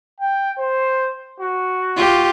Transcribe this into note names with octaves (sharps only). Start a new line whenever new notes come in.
G5
C5
F#4
F4 G4